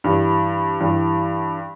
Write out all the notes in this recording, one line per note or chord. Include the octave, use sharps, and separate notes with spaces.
G2 E3 G3
G2 E3 G3